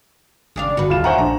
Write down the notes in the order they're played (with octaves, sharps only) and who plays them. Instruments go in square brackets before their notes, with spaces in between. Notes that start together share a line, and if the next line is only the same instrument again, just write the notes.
[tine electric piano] G#1 [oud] C#3 D4 F5
[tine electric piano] G1 [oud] F#4 B4
[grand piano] D#1 F4 E7
[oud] D2 [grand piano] C5 F#5 A#5 [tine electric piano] E5 G#5 C#6
[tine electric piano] A#1 D4 [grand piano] A#5